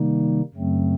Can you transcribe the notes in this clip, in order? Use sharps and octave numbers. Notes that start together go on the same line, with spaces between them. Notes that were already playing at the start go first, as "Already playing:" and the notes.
Already playing: C3 D#3 G3 A#3 D#4
F#2 C#3 F#3 A3 C4